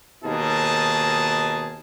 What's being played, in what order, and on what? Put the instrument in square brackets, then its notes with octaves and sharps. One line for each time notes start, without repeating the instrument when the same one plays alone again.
[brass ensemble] D#2 B2 D#4 G#4 A5